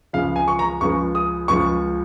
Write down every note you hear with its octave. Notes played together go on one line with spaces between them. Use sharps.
C#2 C#3 F3 G#3 F5
G#5
C#6
A#5
C#2 C#3 F3 G#3 C#6
D#6
C#2 C#3 F3 C#6